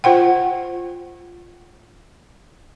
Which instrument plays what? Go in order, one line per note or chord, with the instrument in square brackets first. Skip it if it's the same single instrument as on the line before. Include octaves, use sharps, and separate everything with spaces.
[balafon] F4 C5 F#5 G5